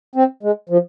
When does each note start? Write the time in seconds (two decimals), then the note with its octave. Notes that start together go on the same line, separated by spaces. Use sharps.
0.16 C4
0.43 G#3
0.69 F3